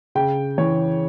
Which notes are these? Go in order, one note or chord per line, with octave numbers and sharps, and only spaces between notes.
C#3 G5
E3 C#5